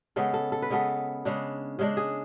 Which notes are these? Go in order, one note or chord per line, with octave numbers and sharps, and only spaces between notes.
C#3 G#3 B3 A4
A4
A4
B4
C#3 G#3 B3 A4
C#3 G#3 D4
C#3 G#3 D4
G#4